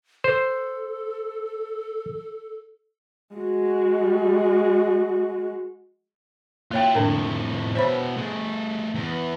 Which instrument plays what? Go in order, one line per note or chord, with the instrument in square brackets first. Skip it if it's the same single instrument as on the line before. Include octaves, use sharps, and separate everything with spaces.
[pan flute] A4 [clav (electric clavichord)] C5
[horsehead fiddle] G#3 F#4
[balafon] A#3 C#5 G5 [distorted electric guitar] E4 F4
[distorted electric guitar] F2 A2 [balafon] D3 D4 A#4
[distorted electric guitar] B2 E5 [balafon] C5 C#5 B5
[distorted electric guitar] A3 G#4
E2